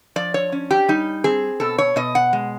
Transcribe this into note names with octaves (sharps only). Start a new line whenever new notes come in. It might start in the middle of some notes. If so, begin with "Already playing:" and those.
F3 D5
C#5
C#4
G4
G3 D#4
C4 G#4
B2 A4
C#5
B2 D#5
F#5
G#3